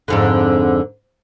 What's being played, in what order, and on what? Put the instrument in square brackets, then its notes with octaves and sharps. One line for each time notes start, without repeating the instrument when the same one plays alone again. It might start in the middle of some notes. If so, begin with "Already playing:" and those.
[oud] F2 G#2 D3